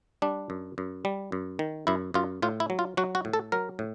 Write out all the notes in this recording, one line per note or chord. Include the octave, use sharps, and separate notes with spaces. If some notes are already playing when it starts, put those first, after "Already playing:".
G3 D4
F#2
F#2
G3
F#2
D#3
F#2 E4
F#2 F4
A2 F4
E4
F#3
F4
F#3 F#4
F#4
A2
A4
F#3 A#4
A2